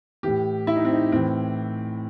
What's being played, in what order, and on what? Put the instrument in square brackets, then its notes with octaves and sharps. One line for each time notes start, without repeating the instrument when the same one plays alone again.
[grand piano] A2 E3 G4
E4
D#4
C4
D#4
A2 E3 C4